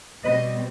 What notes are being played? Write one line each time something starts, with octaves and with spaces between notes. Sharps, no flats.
B2 G3 C4 B4 D#5